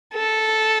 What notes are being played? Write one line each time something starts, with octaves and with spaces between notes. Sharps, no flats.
A4